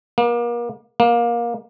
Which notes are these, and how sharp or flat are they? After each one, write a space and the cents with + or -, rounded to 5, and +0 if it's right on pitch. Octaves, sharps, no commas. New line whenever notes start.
A#3 +35
A#3 +20